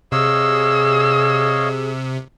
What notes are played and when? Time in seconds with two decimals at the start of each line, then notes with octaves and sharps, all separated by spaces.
0.12 C3 G#4 C#5 D#5 F5 E6